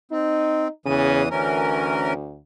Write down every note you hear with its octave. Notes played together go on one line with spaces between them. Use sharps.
C4 D#4
E2 C#3 E3 D#6
D2 E3 C#4 A#4